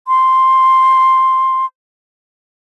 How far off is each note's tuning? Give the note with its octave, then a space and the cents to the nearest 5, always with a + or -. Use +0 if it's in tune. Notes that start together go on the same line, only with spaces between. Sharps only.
C6 +5